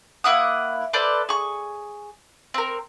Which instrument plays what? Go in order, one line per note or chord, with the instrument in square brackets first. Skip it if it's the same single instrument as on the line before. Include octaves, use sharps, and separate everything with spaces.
[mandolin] A#3 E4 F#5 D#6
A4 B4 C5 D5
G#4 C#6
C4 A#4